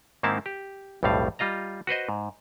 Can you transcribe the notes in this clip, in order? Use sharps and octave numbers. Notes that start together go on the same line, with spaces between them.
G#2 D#3 A#3 C4 E4 A5
G4
B1 F2 A2 G3 F5
G3 F4 D#5 A#5
F#4 B4 C5 D#5
G#2